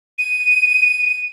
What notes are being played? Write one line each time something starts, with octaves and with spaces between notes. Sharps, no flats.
D#7